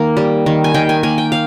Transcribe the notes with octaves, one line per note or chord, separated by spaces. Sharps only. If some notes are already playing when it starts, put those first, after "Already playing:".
Already playing: D#3 A#3
G3
D#3
G#5
D#3 G5
G#5
A#3 G#5
G5
F5